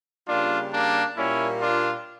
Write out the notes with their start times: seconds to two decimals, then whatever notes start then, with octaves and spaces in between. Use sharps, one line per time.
0.28 C#3 G3 A#3 D4 F4
0.72 A#3 D4
1.17 A#2 G3 A#3 C#4 E4
1.61 D4 F4